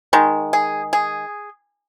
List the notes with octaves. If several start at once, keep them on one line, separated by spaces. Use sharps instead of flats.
D#3 G#3
G#4
G#4